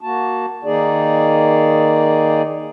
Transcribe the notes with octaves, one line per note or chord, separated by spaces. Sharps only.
A#3 F#4 A5
D#3 A#3 D#4 G#4 D5